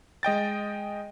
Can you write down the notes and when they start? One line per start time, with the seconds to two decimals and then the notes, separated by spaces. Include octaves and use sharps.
0.23 G#3 D#5 G5 A6